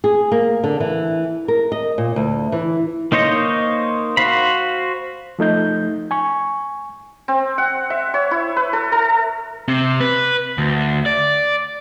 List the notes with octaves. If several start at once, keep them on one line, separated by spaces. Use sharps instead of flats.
G#4
A#3
D3
E3
A#4
D#5
A#2
D2
E3
A#3 D#4 C5 C#5 D#5
F#4 C5 F5 B5
F3 A3 D#4 G6
G#5 C#6
C4
F#5
E5
C#5
E4
B4
A4
A4
C3
B4
D2
D5